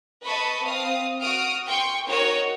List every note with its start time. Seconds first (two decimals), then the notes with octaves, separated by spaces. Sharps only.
0.23 B4 D#5 A5 B5 C#6
0.63 C4 F5 D#6
1.22 F#4 D#6 F6 D7
1.67 G5 C6 C#6
2.09 D#4 F#4 A#4 C#5